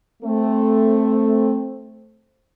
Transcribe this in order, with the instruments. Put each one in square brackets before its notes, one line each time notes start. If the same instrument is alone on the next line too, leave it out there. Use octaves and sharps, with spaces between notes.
[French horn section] A3 C4